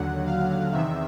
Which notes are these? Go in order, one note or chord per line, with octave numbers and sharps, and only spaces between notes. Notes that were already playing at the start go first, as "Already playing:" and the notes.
Already playing: D#2 D3 F#3 F#5
F5
E2 C3 D#3 E5